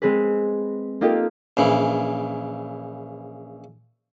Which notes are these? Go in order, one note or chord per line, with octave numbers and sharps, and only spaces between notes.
G#3 C4 G#4 B4
A#3 D#4 F4 G4 A4
A#1 C#3 E3